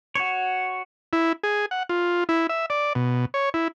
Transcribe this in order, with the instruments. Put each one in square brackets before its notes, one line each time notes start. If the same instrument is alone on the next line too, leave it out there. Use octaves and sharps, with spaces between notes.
[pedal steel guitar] F#4 C#5
[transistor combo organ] E4
G#4
F#5
F4
E4
E5
D5
B2
C#5
E4